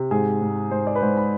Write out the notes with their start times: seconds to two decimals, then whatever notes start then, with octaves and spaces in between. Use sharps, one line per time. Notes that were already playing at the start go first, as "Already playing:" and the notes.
Already playing: C3
0.11 G#2 G#4
0.42 G#2
0.71 G#2 C5
0.87 D5
0.95 B4
1.02 G#2 C5
1.17 B5